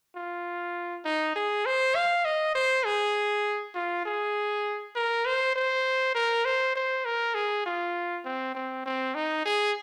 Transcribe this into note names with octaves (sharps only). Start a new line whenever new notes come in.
F4
D#4
G#4
C5
F5
D#5
C5
G#4
F4
G#4
A#4
C5
C5
A#4
C5
C5
A#4
G#4
F4
C4
C4
C4
D#4
G#4